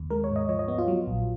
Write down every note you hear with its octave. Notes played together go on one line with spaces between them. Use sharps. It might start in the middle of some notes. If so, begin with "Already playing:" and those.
Already playing: D#2
G#3 A#4
C#5
G#2
D#5
F3 C#5
D#5
B3
F4
F#3
A#1